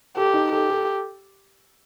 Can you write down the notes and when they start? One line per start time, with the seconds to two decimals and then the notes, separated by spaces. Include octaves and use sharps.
0.16 G4 A4
0.34 D#4
0.52 G4 A4
0.69 A4